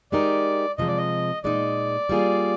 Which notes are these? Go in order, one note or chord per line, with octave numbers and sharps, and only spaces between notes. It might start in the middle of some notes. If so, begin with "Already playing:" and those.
G#3 D#4 G4 A#4 D5
C3 F3 G#3 D#5
D5
D#5
A#2 G#3 D#4 D5
G3 A#3 F4 G#4